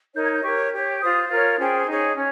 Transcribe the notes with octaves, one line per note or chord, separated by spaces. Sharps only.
D#4 A#4 C#5 G6
G#6
G6
G4 A#4 C#5 C#6
G4 C#5
F4 C5 D#6
F4 A#4 C#5
C#4 G#4 C5 G5
D#4 G#4 C#5
C#4 C#5